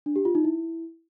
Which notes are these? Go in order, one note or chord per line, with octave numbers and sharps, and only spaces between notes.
D4
G4
F4
D#4
E4